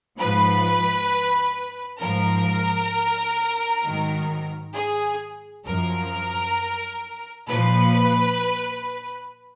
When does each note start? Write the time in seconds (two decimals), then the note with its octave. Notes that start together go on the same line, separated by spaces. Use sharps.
0.18 G#2 F3 B4
2.00 G#2 F3 A#4
3.83 G#2 D#3 F#3
4.74 G#4
5.65 F#2 F3 A#4
7.48 A#2 F3 B4